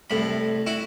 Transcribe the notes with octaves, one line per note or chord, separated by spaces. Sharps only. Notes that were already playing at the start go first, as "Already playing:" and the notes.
C2 A2 B5
E4 F#4